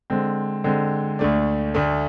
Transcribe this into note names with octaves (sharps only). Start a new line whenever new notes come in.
D3 G#3 C4
D3 G#3 C4
D2 D3 A3 D4
D2 D3 A3 D4